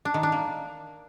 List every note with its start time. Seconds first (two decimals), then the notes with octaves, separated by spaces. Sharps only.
0.05 D4
0.14 D#3
0.23 D4
0.32 A#3